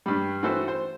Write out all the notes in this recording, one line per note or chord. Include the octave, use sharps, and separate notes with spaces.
G2 G3
E3 A3 F#4 A4 C5
C5